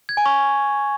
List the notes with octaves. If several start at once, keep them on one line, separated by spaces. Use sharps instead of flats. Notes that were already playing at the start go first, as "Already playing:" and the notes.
G#6
G#5
C#6